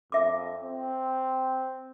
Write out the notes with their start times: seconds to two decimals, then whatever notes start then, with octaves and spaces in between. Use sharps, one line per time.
0.12 F2 E5 D6
0.63 C4